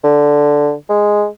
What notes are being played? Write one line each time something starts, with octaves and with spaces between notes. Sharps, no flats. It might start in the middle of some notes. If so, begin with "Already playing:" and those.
D3
G#3